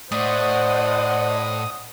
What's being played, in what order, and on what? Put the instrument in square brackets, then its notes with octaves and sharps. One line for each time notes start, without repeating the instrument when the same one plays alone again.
[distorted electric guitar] A2 [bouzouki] D4 [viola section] C5 D#5 F#5 [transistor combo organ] D#6